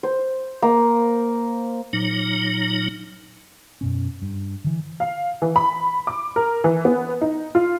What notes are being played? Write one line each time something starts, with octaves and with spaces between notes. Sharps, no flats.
C5
A#3
A#2 F#3 D#4
F#2 B2 C#4
G2
D3 E3
F5
E3
B5
D6
A#4
E3
B3
D#4
F4